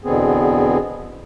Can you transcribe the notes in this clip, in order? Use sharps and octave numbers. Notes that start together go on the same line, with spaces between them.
E2 B2 D3 B3 C4 G#4